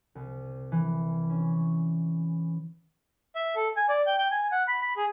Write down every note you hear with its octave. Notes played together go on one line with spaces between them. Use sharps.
C2
E3
C#4
E5
A4
G#5
D5
G5
G5
G#5
F#5
B5
B5
G#4